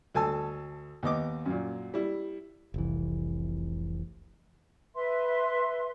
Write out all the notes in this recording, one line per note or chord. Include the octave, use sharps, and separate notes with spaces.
D2 A4 G#5 A5 E6
D#2 B3 D#5 D6
F#2 A#2
G3 E4
F1 C2 E3
B4 E5 C6